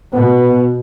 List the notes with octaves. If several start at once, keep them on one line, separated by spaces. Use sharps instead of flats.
B2 B3